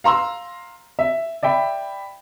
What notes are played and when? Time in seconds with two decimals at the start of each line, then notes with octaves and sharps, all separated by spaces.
0.04 F5 A#5 C6 E6
0.99 E5
1.43 D5 E5 G5 B5